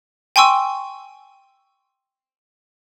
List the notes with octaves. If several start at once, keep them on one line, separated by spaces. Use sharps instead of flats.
G5 G#5 C6 C#6 E6